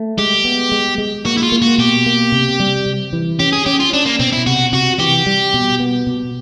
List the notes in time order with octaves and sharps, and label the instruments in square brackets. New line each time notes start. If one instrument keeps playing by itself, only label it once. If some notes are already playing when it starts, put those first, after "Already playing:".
Already playing: [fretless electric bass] A3
[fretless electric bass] G#3 [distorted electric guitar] G4
[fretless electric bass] B3
G#3
G#3
[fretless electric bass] A#3 [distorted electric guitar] F#4
[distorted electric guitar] E4
F4
[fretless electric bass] A#3
[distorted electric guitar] F#4
[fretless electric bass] B2 [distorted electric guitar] G4
[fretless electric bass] A#3
C3
G3
C3
E3
[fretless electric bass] C#4 [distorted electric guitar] G4
[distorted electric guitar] G#4
[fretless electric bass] C#4 [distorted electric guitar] G4
[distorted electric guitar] F4
[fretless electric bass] C#4 [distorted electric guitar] D4
[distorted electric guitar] A#3
[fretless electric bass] B2 [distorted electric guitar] C4
[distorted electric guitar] E4
[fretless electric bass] C3 [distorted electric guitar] F#4
[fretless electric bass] C3 [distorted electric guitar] F#4
[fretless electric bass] E3 [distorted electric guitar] G4
[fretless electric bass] G3
B2
B3
B2